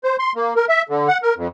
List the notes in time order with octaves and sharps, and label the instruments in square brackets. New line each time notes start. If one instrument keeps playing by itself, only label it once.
[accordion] C5
C6
A#3
A#4
E5
D3
F#5
A#4
F2